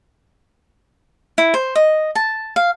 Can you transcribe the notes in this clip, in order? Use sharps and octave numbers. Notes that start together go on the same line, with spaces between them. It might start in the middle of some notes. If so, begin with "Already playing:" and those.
E4
C5
D#5
A5
F5